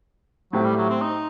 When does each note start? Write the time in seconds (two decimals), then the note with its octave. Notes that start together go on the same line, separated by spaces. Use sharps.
0.53 A2 F#3 A3 C4 G4
0.65 G3
0.77 F#3
0.89 C4
1.02 D#4